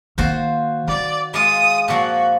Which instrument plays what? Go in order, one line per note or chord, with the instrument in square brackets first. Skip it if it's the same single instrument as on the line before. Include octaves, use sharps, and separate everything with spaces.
[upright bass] D#3 A#3 [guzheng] F4 F#4 C5
[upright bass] D#3 [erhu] D5
[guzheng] G#3 F4 [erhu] D#6
[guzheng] A#2 F3 [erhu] F#4